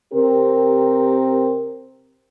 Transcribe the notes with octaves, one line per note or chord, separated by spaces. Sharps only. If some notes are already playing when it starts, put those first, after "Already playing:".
C3 C4 G4 A#4